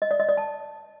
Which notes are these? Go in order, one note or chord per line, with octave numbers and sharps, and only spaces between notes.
D#5
D5
D#5
D5
A5